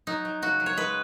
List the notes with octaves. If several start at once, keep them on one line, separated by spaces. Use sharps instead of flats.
F#3 D#4
F#3
C#3 F#4
F#3
C#5
G#3 B4